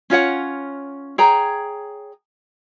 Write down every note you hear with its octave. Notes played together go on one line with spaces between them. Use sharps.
C#4 F4 C#5 F#5
G#4 C#5 G5 A#5